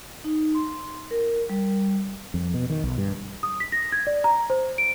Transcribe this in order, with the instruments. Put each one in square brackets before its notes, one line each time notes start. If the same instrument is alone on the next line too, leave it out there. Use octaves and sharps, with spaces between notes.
[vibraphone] D#4
C6
A#4
G3
[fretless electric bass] F2
B2
D#3
B1
G2
[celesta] D#6
B6
A#6
G#6
D5
A#5
C5
D7